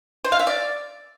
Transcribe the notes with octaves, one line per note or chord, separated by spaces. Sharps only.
C5
F5
E5
D5